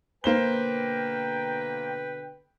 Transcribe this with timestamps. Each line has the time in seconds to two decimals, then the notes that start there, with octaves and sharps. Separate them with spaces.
0.24 B2 D3 A#3 B4 C5 G5 G7